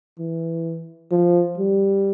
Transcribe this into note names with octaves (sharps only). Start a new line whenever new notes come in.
E3
F3
G3